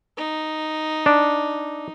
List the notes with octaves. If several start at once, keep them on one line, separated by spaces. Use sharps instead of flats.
D#4
D4